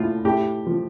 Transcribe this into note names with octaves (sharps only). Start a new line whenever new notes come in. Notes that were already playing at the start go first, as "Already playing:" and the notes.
Already playing: A2 F4
A2 G4
F3